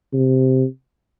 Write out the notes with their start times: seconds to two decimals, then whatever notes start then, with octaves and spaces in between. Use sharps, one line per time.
0.13 C3